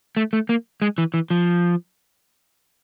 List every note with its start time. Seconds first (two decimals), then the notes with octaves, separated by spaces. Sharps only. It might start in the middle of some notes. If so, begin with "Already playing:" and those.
0.17 A3
0.33 A3
0.49 A#3
0.82 G#3
0.98 E3
1.14 E3
1.30 F3